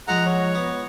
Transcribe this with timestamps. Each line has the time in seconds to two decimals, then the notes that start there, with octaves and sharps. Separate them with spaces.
0.08 G#2 F3 G#3 F#5 A#5
0.26 C#5
0.55 B3